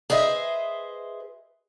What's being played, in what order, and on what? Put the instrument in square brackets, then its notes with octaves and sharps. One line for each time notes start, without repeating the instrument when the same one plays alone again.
[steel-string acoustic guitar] G#4 B4 C5 D#5 E5